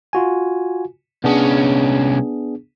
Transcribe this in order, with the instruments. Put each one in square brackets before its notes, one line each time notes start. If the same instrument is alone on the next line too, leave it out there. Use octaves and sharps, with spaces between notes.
[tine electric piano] F4 F#4 G#5
[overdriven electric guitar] C2 C#4 [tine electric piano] B3 D4 G#4